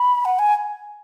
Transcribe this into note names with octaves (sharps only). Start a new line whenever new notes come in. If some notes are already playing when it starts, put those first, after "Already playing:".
Already playing: B5
F#5
G#5